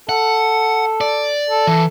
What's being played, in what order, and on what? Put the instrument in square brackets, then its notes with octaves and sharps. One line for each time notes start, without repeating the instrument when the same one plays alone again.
[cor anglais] A4 [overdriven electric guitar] F#5
[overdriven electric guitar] D5
[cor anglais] A4
[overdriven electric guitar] E3